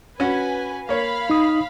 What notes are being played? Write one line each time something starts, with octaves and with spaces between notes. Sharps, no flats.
C#4 F#4 B4 G#5
A#3 C#5 F5 B5
D#4 D#6